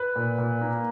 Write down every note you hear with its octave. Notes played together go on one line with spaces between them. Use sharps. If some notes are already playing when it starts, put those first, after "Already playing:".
Already playing: B4
A#2
A#2
A#3